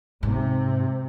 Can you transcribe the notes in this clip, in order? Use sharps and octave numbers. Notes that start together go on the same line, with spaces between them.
G#2 C3